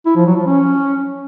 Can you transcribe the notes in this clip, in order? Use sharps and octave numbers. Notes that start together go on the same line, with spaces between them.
E4
F3
F#3
F3
C#4